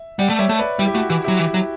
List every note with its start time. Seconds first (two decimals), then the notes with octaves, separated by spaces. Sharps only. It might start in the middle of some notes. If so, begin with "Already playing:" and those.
Already playing: E5
0.19 G3 D5 F#5
0.29 A3
0.39 G3 C#5 E5
0.49 A3
0.59 B4 D5
0.79 G3 E4
0.87 G4
0.94 A3 F#4
1.09 E3 E4 G4
1.24 F#3 E4 G4
1.39 E3
1.54 F#3